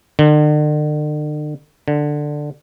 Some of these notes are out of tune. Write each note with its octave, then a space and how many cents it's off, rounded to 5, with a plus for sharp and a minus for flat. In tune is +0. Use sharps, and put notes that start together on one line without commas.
D3 +45
D3 +10